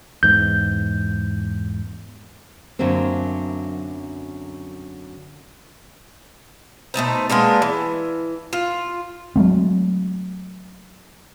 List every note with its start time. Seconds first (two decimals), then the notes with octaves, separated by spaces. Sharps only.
0.23 E2 G#2 G6
2.79 F#2 D3 F#3 A3 A#3 C4
6.94 B2 A3 D#4 C5
7.30 G#3 A#3 B3 D4
7.62 E3
8.53 F4
9.36 F#3 G#3 A3 C4